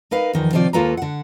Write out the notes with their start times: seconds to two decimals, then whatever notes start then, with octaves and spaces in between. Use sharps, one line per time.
0.11 D#4 A#4 B4 F5
0.33 E2 D#3 F3
0.53 C3 D#3 F3 F4 D5
0.73 D#2 A#3 F4 A4 B4 A#5
0.97 D3 F#5